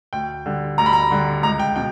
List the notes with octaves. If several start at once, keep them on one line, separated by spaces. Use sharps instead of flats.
D2 G5
D3 G3
D2 A#5
B5
A#5
D3 G3
C#2 A#5
G5
B2 G5